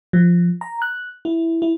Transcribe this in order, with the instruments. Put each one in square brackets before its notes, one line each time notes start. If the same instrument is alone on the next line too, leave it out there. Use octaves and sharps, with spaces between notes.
[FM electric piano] F3
A#5
F#6
E4
E4